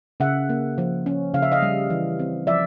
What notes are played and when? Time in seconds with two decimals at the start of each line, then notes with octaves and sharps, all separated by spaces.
0.20 C#3 E5 F#5
0.49 A#3
0.78 F3
1.06 C#4
1.34 C#3 F5
1.42 E5
1.52 D#5 F5
1.63 G3
1.90 E3
2.19 C4
2.47 F3 D5 E5